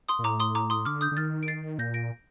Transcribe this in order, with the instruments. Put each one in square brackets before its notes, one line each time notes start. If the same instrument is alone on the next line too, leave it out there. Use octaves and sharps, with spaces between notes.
[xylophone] C6 D#6
[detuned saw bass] A#2
[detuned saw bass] A2 [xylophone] A#5 D6
[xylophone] C6 D#6
A#5 D6
C6 D#6
[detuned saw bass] D3 [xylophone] D6 F6
[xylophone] D#6 G6
[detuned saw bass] D3
[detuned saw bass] D#3 [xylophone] F6 A6
[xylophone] D7
A6 C7
[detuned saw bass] A#2 [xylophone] G6 A#6
[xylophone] A#6 D7